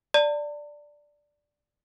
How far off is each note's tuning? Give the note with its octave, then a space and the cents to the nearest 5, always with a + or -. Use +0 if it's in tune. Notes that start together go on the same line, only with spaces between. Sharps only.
D5 +0 A5 +45